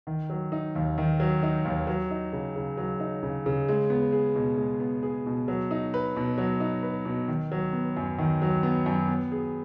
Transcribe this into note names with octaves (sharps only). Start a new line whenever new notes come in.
D#3
F#3
D#4
D#2
D#3
F#3
D#4
D#2
F#3
D#4
C#3
C#3
F#3
D#4
C#3
C#3
G#3
B3
G#4
B2
G#3
B3
G#4
B2
F#3
D#4
B4
B2
F#3
D#4
B4
B2
D#3
F#3
B3
F#2
D#3
F#3
B3
F#2
B3
G#4